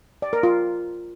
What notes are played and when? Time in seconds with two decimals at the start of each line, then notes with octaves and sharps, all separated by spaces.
0.22 D5
0.33 A#4
0.43 F4